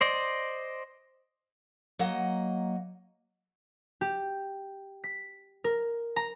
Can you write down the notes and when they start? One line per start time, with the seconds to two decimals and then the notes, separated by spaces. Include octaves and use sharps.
0.01 C5 D5 D#5
1.99 F#3 A#3 D#5 F#5
4.01 G4
5.04 B6
5.64 A#4
6.16 A#5